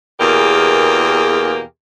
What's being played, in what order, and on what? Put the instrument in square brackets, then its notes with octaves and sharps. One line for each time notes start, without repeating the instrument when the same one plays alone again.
[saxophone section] E2 B2 A#3 G4 G#4 A#4